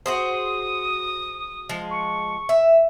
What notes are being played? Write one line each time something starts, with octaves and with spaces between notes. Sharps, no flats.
F#4 G#4 C5 D#6
F3 G#3
C#6
E5